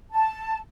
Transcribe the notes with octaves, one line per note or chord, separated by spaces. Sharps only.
A5